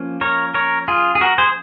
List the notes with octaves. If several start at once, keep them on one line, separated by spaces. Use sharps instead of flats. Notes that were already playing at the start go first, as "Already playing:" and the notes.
Already playing: F3 A#3 C#4
A#4 C#5
A#4 C#5
F4 G#4
G#4
F#4 A#4
G#4 C5